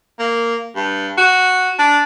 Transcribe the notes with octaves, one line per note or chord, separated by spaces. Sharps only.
A#3
G2
F#4
D4